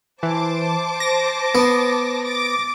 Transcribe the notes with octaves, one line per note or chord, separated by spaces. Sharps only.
E3 C5 A5 D6
A#6
B3
D6 A6